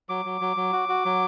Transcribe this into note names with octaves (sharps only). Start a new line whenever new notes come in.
F#3 D6
F#3
F#3
F#3
F#4
F#4
F#3